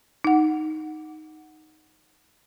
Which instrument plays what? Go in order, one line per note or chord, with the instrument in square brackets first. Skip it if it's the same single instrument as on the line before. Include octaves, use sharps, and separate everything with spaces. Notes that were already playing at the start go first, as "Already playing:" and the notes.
[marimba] D#4 F#5